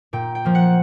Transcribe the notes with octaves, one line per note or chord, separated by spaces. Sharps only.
A#2 G5
G5
F3 A#3
F#5